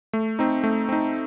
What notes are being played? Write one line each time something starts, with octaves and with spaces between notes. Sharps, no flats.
A3
C4 D#4
A3
C4 D#4